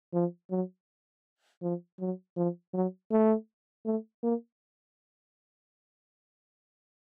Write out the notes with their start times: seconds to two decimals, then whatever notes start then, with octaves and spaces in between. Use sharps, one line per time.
0.13 F3
0.50 F#3
1.62 F3
2.00 F#3
2.37 F3
2.74 F#3
3.11 A3
3.85 A3
4.23 A#3